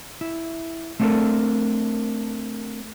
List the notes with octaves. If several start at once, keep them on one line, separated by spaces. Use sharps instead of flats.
E4
A3 C4 D4 F#4 A4 A#4